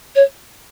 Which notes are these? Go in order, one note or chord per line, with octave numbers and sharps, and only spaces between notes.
C#5